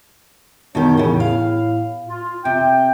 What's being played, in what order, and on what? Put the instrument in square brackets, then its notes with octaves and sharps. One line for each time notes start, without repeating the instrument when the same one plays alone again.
[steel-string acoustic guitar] B2 D#3 G4 [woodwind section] D4 C#5
[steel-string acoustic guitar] E2 C#3 [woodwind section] A2
[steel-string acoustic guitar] F5
[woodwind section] F4
[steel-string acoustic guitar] C3 [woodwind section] G5